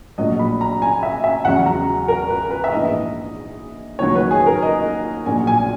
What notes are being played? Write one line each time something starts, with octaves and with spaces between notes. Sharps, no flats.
A#1 A#2 F#3 D#5
B5
A#5
G#5
E5
E5
E2 C#3 F#3 F#5
A#5
A#4
B4
B4
E5
A#1 G#2 E3 D#5
D#2 D#3 F#3 C#5
B4
G#4
A#4
D#5
A#1 A#2 F#3 G#5
G#5